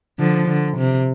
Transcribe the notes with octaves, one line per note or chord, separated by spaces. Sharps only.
D3 F3
D3
C3